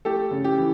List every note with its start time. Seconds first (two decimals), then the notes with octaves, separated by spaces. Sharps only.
0.05 A3 G4 A4
0.31 C#3
0.44 G4
0.57 E3